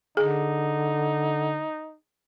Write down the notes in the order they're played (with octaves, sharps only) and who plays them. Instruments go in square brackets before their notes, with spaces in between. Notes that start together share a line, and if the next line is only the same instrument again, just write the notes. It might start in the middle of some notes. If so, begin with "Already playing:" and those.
[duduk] D3 [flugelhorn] D#4 [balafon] G#4